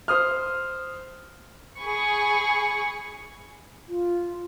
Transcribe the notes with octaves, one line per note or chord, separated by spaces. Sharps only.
C5 D#6 F6
G#4 B5 C#6
F4